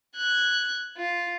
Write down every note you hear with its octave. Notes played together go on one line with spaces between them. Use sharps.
F#6 G#6
F4